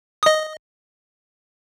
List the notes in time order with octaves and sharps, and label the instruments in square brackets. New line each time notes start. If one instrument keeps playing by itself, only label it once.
[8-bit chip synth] D#5 D#6